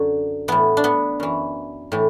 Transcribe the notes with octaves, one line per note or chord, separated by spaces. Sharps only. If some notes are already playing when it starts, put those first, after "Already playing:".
Already playing: F#2 D3
A2 E3 B3
D4
B3
F#2 E3
A2 E3